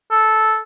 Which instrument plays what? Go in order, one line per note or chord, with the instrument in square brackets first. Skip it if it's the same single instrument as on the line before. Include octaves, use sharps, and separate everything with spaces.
[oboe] A4